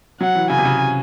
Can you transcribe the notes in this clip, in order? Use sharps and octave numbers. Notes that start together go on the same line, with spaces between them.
F#3 F#5
E3
C#3 G#5
C3
C#3